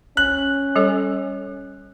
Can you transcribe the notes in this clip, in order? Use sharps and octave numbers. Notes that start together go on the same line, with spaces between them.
C#4 F#6
G3 A4 C#5